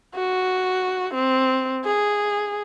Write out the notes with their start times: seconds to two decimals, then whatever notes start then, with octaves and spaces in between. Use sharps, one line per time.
0.15 F#4
1.14 C4
1.85 G#4